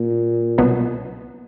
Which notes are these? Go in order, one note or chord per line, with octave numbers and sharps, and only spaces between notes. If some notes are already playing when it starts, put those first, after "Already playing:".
Already playing: A#2
C2 B2 F#3 B3